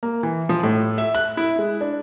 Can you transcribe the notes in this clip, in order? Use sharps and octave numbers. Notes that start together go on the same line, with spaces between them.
A#3
E3
F3
A2
E5
F#6
E4
G#3
D4